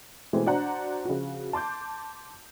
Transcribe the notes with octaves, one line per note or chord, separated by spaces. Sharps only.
B2 E3 G#3 A3 C4
D4 F#4 C5 F#5 A#5
C#3 F3 F#4
A5 C6 D6 G6